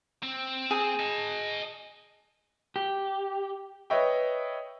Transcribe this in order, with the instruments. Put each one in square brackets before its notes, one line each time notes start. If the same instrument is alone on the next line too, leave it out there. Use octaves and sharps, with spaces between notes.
[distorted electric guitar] C4
[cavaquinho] G#4
[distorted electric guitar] D#5 A5
[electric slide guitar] G4
[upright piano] B4 C#5 D#5 E5 G5